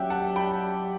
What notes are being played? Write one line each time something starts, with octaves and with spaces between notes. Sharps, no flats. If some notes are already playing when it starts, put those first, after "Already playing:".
Already playing: F#3 C#4 G4 E5 F#5 G5
F#5 A5
G5 B5